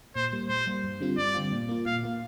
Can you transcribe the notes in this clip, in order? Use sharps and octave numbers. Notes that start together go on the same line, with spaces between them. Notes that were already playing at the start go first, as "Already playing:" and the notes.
A#2 C5
G3 A#3
A#2 C5
G3 A#3
G2
D3 G3 C4 F4
G2 D5
D3 G3 C4 F4
A#2
A#3 F4
A#2 F5
A#3 F4